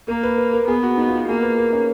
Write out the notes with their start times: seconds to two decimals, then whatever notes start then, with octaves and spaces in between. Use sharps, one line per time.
0.08 A#3 A#4
0.23 B4
0.38 B4
0.53 A#4
0.67 B3 G#4
0.83 F#4
0.98 D#4
1.08 F4
1.18 F#4
1.28 A#3 G#4
1.43 B4
1.58 A#4
1.73 C#4